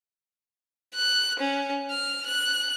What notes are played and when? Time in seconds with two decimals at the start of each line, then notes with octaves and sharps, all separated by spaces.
0.95 F#6
1.39 C#4
1.91 F6
2.26 F#6